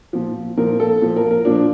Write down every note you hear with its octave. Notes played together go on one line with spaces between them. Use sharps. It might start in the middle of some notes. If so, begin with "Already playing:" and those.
A#2 F3
A#2 F3 A#4
A4
A#2 F3
A#4
A#4
A#2 F3 D4